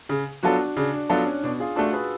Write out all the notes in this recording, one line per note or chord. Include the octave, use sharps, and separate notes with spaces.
C#3
F#3 B3 D4 F4 F#4 A4
C#3 D4
D4
F#3 B3 D4 F4 A4
C#4
B2 D4
F4 G#4
A3 D4 F#4 A4
G#4 B4